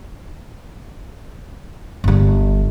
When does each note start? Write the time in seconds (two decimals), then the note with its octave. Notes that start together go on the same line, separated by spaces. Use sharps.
2.04 G1 G3